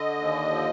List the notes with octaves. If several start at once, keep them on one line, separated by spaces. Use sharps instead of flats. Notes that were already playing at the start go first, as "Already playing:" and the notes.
Already playing: D3 D#5
D#2
F3